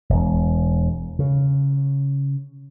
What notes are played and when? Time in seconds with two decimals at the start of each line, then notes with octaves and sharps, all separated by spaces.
0.10 E1
1.19 C#3